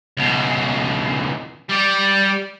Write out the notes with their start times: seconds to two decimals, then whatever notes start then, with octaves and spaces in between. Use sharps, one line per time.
0.17 C#2 B2
1.69 G3 D5